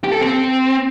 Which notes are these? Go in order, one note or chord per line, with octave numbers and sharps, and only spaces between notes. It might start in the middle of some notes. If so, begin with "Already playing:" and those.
G4
A4
C4